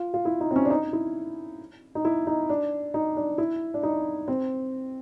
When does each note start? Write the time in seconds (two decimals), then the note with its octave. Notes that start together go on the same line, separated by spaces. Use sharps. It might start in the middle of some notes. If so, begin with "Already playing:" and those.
Already playing: F4
0.14 F4
0.25 E4
0.41 D#4
0.51 C4
0.56 C#4
0.65 D4
0.70 D#4
0.93 E4
1.95 D#4
2.05 E4
2.27 D#4
2.49 D4
2.94 D#4
3.16 D4
3.38 E4
3.74 D4
3.83 D#4
4.28 C4